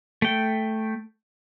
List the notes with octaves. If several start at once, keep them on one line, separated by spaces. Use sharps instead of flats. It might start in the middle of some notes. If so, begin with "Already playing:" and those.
A3 G5